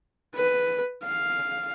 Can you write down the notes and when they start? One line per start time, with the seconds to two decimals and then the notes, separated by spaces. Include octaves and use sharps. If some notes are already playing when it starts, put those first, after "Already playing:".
0.35 B4
1.04 F5